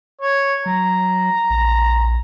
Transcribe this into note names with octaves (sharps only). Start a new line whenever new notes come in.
C#5
F#3 A#5
A#1